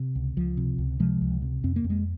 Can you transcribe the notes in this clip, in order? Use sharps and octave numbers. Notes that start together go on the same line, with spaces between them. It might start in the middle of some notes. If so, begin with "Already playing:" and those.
Already playing: C3
C#2
C#2 F3
C3
C#2
C3 F3 G#3
C#2
C3
F2 C4
A#3
F2
G#3